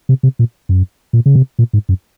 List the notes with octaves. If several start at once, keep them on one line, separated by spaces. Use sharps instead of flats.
C3
C3
A#2
F#2
A#2
C#3
C3
A#2
G#2
F#2